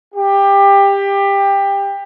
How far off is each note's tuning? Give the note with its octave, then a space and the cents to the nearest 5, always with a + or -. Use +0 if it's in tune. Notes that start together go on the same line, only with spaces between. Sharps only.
G4 +20